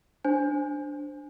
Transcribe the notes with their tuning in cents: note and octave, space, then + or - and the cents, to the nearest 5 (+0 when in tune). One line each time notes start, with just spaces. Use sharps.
D4 +0 C5 +0 G#5 +0